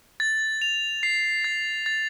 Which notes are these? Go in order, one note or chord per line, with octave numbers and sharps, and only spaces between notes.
A6
F7
C7
A6
A6